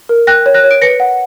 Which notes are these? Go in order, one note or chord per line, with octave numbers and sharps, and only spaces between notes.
A#4
G5 F#6 A#6
C#5
F#6 A#6
C#5
D7
B4 A#6 C#7
F#5